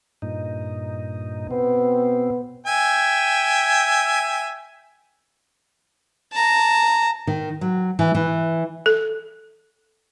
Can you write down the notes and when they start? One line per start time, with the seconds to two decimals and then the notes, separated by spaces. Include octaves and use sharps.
0.22 G2 A#2 D#4
1.51 B2 B3 C4
2.66 E5 G5 G#5
6.33 A5 A#5
7.27 D#3
7.61 F#3
7.99 E3
8.15 E3
8.86 A4